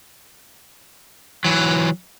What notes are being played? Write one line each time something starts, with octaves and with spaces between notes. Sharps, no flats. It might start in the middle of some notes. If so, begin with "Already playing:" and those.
E3 F#3